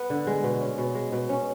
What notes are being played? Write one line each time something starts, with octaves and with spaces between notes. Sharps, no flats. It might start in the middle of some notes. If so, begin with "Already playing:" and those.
Already playing: B3
D3
G#3
B2
C#4
B2
G#3
B2
C#4